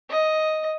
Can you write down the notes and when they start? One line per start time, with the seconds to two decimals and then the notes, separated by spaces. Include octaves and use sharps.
0.10 D#5